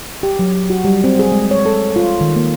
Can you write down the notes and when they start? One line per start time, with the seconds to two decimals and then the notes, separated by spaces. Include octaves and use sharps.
0.23 G4
0.39 F#3
0.70 F#4
0.85 G3
1.04 C4
1.19 G#4
1.32 G#3
1.51 C#5
1.66 A4
1.96 F4
2.21 D#3
2.36 A#3